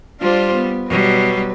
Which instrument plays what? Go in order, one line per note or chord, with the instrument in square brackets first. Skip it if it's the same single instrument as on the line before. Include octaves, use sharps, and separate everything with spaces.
[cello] G3 [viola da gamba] D4 F4 C5
[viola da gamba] B3
[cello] B2 G3 [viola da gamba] F#3 B4